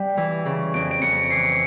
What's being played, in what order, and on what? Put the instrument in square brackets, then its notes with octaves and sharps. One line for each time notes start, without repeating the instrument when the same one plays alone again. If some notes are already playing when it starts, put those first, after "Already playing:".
Already playing: [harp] G3
E3
C#3
[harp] F2 [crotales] D7
[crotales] D7
[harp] F2 [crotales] C#7
[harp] E3 [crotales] C7